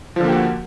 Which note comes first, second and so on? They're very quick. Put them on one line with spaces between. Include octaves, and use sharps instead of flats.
F3 D3 A#3 G4 F#4